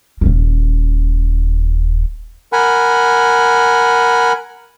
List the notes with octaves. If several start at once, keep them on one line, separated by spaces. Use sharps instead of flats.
D#1 C#4
A#4 F#5 G#5 B5